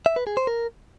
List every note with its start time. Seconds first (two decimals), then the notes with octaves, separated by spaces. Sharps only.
0.06 E5
0.16 B4
0.27 G#4
0.37 C5
0.47 A#4